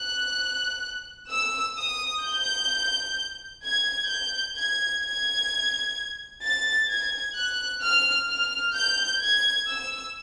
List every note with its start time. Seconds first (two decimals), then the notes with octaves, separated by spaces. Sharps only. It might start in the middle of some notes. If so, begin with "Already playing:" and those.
Already playing: F#6
1.30 E6
1.77 D#6
2.23 G6
3.63 G#6
4.09 G6
4.57 G#6
5.02 G#6
6.42 A6
6.89 G#6
7.36 F#6
7.82 F6
8.29 F6
8.75 G6
9.22 G#6
9.68 E6